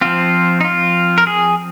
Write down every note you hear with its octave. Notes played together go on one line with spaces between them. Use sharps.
F3 C4 F4
D#4
F4
A#4
G#4